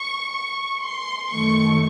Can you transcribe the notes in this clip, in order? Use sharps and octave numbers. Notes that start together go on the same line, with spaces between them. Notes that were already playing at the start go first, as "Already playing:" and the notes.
Already playing: C#6
C#6
C6
F#2 D#3 A3 C#6